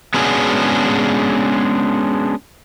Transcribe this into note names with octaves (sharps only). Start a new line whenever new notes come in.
G#3 B3 C#4 D4 F#4 G#4